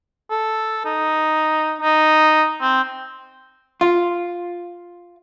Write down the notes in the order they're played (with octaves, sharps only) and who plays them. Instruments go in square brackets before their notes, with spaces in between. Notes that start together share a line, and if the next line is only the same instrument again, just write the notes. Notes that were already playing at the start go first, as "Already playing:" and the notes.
[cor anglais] A4
D#4
D#4
C4
[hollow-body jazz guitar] F4